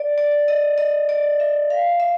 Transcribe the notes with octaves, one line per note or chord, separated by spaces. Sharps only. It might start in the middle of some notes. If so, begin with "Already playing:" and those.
Already playing: D5
D5
D#5
D#5
D5
E5
F5
E5